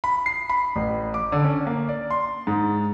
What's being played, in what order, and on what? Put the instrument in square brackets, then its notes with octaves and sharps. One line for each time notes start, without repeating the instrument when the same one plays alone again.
[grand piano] B5
C7
B5
A1
D6
D3
C#4
A#3
D5
C6
G#2